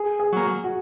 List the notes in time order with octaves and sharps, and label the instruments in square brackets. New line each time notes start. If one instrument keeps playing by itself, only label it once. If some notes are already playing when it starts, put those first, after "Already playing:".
Already playing: [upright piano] G#4
G#4
[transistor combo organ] F#3 A#3
[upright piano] F#4